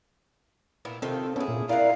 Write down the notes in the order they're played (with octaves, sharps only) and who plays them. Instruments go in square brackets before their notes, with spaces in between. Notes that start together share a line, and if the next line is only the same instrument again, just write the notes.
[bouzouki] A#2 B3 E4
[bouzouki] C3 D#3 F4 [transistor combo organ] C4 A4
[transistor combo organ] B3 C#4 A4 [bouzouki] E4 G#4
[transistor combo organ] A#2
[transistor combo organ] E4 A#4 [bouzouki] D5 F#5 [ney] F5